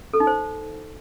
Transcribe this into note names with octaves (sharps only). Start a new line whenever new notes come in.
A4
D#4
C5